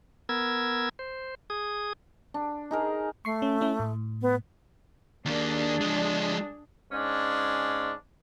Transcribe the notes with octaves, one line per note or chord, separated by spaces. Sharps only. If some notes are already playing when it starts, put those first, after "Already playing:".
B3 A#4 E6 G#6
C5
G#4 D#6
D4
D#4 G#4 A#4
A3 C#6 C7
C#4
C#4 E4
A2
B3
D#2 A#3 D4 G#4
F3 G#3
G#2 C#4 D4